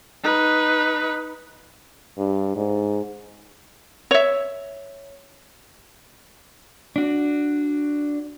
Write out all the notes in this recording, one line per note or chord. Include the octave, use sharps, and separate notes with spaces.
D#4 B4
G2
G#2
C#5 E5
D4 F#4